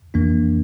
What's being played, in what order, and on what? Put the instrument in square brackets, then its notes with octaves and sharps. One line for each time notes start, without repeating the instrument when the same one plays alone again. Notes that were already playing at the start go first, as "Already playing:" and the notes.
[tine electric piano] F2 E3 A#3 D4